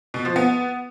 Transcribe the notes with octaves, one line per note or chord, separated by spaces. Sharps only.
B2
F3
B3